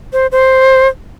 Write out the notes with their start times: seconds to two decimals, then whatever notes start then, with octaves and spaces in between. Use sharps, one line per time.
0.13 C5
0.32 C5